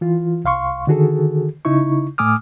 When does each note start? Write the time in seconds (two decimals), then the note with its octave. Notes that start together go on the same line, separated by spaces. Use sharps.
0.01 E3 F4
0.45 C2 F5 C6 C#6
0.87 D3 D#3 F#4 G#4 A4
1.65 C#3 D#4 E4 C#6
2.18 A2 A3 G#5 D6 D#6 F6